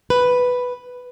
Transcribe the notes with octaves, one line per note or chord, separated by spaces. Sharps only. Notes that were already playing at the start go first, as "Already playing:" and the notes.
B4